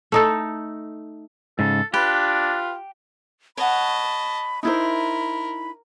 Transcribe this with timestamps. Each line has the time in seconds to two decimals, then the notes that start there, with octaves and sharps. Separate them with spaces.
0.12 A3 D#4 A4
1.59 G#2 C#3 A4
1.94 D4 F4 G4 B4
3.57 C#5 D#5 F#5 A5 B5
4.63 D#4 E4 A#4 C5 B5